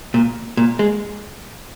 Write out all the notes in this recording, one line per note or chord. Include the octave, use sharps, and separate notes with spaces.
A#2
A#2
G#3